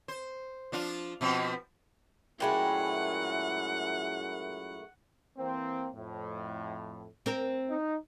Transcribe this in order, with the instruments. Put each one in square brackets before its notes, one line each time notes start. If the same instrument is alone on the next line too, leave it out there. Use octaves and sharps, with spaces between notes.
[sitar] C5
F3 D4 F4
B2 F3 C4
[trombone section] F#2 E4 [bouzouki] A#2 G#3 A3 [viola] F#5 [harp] G5 B5
[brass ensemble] E3 A#3 C4
F2 A2
[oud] C4 A#4
[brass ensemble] D#4